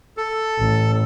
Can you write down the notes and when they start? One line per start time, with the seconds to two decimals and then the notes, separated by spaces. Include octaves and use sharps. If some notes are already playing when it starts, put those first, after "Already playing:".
0.17 A4
0.59 A1